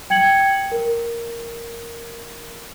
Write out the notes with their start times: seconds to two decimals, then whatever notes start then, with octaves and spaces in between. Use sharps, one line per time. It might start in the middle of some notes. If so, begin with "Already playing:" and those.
0.10 G5 G#6 C#7 F#7
0.72 A#4